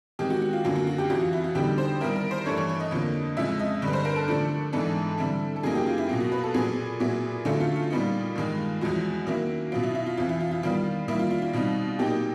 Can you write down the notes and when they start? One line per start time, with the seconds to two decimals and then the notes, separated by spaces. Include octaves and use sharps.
0.19 D#3 G#3 C4 G4
0.30 F#4
0.42 F#4
0.53 F4
0.65 F#2 D3 F#3 A#3 F4
0.76 F#4
0.87 F#4
0.98 G4
1.10 F2 C3 E3 F#4
1.21 F4
1.33 E4
1.44 F#4
1.55 D3 G3 B3 D#4 G4
1.78 C5
2.00 D#3 G3 B3 E4 A#4
2.16 A#4
2.31 C5
2.46 G2 E3 A3 D4 C#5
2.57 C#5
2.69 C#5
2.80 D#5
2.91 F2 D3 F3 A#3
3.37 F2 C#3 F3 G#3 C#4 E5
3.59 D#5
3.82 G2 D3 G3
3.88 B4
3.93 C5
4.05 A#4
4.16 A4
4.28 D3 F3 A3 D4
4.73 G#2 E3 G#3 B3 D4 A4
5.18 D3 G3 C4 E4
5.56 A4
5.63 F#2 C#3 F#3 A#3 D#4 G#4
5.75 G4
5.86 F4
5.98 E4
6.09 B2 F#3 A#3 F4
6.20 F#4
6.32 B4
6.44 A4
6.54 A#2 F#3 B3 G#4
7.00 A#2 F#3 B3 E4
7.45 D3 F#3 A3 C#4 E4 F4
7.60 F4
7.76 F4
7.90 A#2 G3 B3 D#4
8.35 G2 D#3 G#3
8.81 E2 C3 F3 G#3 C4 F#4
9.27 D#3 F#3 A#3 C#4 E4
9.72 B2 F#3 B3 F4
9.83 E4
9.95 E4
10.06 F4
10.17 F2 C3 E3 F4
10.29 E4
10.40 F4
10.51 F4
10.63 D#3 G3 B3 F4
11.08 D#3 G3 A#3 E4
11.19 F4
11.31 F4
11.42 F4
11.53 B2 G3 C4 D#4
11.99 A#2 F#3 A#3 D#4 G4